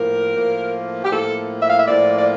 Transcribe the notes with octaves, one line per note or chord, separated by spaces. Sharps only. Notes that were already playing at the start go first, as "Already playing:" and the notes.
Already playing: A2 F3 A#3 A#4
A2 F3 A#3
G4
A2 F3 A#3 A4
E5
F5
E5
A2 F3 A#3 D5
D5